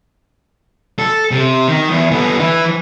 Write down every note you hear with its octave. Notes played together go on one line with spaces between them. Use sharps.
A4
C3
D#3
E2
D3 B3
E3